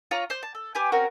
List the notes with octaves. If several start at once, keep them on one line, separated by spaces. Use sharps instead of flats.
F4 C#5 A#5
C5 G6
A5
A4
G4 B4 G#5
C4 C#4 F#4 A#4